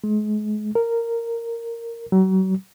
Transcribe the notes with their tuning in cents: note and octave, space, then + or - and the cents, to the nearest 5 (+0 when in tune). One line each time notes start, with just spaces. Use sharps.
G#3 +35
A#4 -10
F#3 +35